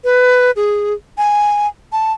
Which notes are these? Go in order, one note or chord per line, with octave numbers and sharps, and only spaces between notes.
B4
G#4
G#5
A5